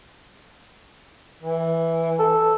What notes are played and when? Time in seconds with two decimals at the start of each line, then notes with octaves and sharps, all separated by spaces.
1.42 E3
2.19 A4